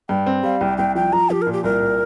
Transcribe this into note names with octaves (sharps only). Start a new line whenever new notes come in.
G2 G5
C4
G3 F5
C2 G5
C2 G5
F3 G5
F3 A#5
F3 G4
A#4
A#2
G4
C2 A#4
A#2